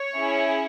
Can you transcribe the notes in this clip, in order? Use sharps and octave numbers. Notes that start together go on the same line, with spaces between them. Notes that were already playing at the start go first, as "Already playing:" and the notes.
Already playing: C#5
C#4 E4 G#4